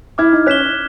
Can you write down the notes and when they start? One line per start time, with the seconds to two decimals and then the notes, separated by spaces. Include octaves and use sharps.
0.18 E4 D6 F6 G#6
0.33 D#4
0.46 C#4 F#6 B6 E7 G7